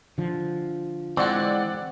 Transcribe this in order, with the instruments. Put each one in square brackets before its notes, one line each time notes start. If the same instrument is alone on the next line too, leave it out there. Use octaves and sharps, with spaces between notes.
[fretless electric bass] D3 F3
[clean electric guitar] E3 G#3 [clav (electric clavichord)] C4 [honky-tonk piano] D5 F#5